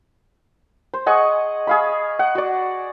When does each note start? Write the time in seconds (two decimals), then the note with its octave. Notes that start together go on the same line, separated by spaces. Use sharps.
0.94 C5
1.06 G#4 D#5 F#5 C#6
1.67 G#4 F5 B5
2.19 F#5
2.35 F#4 D5